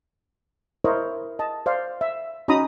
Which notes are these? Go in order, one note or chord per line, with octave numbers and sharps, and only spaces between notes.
E4 A#4 C5 C#5 D#5
D#5 A5
C5 D5 F5
E5
C#4 D#4 F#4 A#5 B5 D#6